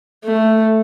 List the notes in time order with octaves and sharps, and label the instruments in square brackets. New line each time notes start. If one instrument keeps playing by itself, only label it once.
[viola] A3